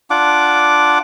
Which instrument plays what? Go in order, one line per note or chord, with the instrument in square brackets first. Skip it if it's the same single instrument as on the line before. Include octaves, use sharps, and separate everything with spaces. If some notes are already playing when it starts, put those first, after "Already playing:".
[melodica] D4 F4 F#5 D6